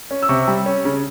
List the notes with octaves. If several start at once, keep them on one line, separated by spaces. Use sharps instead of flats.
C#4
E6
C3 C#6
G3
C#4
C#3